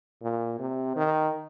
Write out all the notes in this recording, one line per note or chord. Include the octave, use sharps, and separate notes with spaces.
A#2
C3
D#3